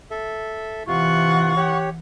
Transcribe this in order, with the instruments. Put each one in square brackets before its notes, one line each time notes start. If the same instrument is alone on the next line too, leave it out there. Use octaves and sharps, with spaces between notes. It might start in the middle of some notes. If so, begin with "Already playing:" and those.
[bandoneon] A4 E5
[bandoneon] C3 F4 [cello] E3 F#5 [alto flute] C#6
[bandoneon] G4 C#5